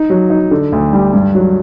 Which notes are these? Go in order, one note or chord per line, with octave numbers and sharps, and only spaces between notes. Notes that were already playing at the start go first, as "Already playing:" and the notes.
Already playing: D#4
F#3
D#4
D3
D2
G3
G2
F#3